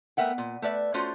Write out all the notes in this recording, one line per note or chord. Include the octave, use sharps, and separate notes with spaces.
A3 B3 A#4 E5 F#5 G5
A#2
A3 B4 D5 E5
A3 C#4 F4 F#4 C5